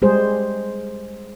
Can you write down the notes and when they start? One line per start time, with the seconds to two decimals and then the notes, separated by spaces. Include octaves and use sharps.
0.02 G3 G#3 G#4 C5